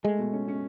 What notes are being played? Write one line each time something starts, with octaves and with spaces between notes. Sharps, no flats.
G#3 A3
B2
C#4
C#4